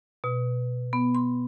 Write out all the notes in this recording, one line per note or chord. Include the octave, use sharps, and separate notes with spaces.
B2
B3
C6